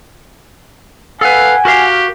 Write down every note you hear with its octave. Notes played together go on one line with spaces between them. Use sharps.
A4 B4 F5 F#5 G#5
F#4 G4 A#4 F5